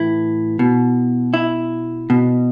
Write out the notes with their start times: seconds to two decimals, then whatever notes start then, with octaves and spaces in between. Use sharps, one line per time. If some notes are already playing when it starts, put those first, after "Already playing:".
Already playing: A2 E3 E4
0.59 B2
1.34 E4
2.10 B2